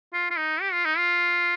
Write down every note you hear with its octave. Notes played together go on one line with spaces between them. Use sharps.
F4
F4
D#4
G4
F4
D#4
F4